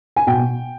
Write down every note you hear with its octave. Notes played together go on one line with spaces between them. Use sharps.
G#5
B2 G5